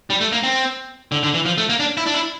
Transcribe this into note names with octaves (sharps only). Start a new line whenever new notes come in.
G3
A3
A#3
C4
D3
D3
E3
F3
A3
A#3
D4
E4
D4
E4